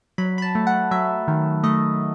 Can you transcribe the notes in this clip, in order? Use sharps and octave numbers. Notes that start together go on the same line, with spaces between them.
F#3 B5
B5
A5
A3
F#5
F#3 E5
D#3
A3 D#5